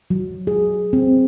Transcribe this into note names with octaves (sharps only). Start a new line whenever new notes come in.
F#3
G#4
C4